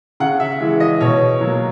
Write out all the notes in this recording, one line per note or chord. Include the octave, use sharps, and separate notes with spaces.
C#3 F#5
E5
E3 G#3
D#5
B2 C#5
F#3 A#3